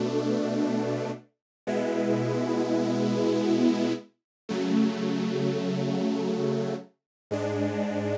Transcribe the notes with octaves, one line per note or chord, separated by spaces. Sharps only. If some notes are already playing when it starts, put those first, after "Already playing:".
Already playing: B2 A3 D4
B2 G#3 B3 E4
C#3 F#3 A3
G#2 G#3 D4